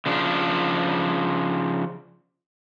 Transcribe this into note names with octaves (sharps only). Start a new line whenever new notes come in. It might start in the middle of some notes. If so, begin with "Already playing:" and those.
C#3 F3 D4